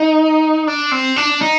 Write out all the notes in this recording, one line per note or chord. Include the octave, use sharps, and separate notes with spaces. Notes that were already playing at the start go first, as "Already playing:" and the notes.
Already playing: D#4
D4
C4
D4
D#4